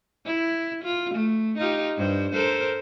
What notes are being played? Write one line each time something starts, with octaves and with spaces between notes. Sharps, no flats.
E4
F4
A3
D#4 F4 G4
G2 C5
A4 A#4 C5